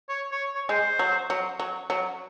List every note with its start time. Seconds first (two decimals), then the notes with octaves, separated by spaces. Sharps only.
0.09 C#5
0.32 C#5
0.55 C#5
0.69 G#3 C5
0.99 F#3
1.30 F#3
1.59 F#3
1.90 F#3